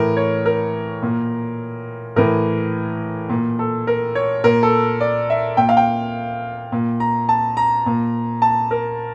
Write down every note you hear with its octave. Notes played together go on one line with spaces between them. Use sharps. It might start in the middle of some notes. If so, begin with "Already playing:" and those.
Already playing: A2 E3 A#4
C#5
A#4
A#2
A2 E3 A#4
A#2
A4
A#4
C#5
A#2 A#4
A4
D5
E5
A#2 G5
F5
G5
A#2
A#5
A5
A#5
A#2
A5
A#4